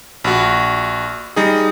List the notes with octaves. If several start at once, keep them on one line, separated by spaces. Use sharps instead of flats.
A#1 F#4
G3 D#4 G#4